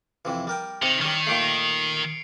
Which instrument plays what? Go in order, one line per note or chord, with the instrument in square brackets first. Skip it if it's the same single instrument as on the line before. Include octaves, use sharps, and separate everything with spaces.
[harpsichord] F2 C3 E3
G3 A#4 G5
[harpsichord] C3 [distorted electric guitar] D#3 [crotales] C#7 F7
[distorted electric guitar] D#3 [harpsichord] G3 C#4
[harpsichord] A#2 G3 A3 [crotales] C7 D7